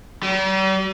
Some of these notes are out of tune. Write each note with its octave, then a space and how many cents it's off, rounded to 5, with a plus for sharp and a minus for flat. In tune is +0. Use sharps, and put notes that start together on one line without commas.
G3 -45